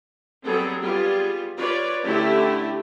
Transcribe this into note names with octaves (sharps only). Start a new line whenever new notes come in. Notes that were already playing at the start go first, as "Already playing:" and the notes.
F#3 G3 B3 C4 G#4 A4
G3 B3 F4 G#4
F4 B4 C#5 D5
D3 A3 C#4 E4 G4